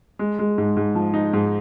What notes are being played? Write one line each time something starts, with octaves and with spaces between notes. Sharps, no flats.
G#3
G#3
G#2
G#2
F3
D#4
G#2